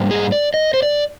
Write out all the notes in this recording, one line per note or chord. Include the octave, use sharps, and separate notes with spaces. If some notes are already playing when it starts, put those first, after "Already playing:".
Already playing: G#2 G3 A#3
G#4
D5
D#5
C5
D5